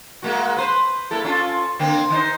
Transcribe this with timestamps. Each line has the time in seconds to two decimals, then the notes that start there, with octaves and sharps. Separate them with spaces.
0.22 G#3 A#3 F#4
0.57 B4 C5
1.11 A#3 E4 A4
1.24 C#4 F4 A4
1.79 D3 A#3 C4
2.10 D#3 D#4 C5